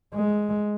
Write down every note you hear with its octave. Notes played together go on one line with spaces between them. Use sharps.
G#3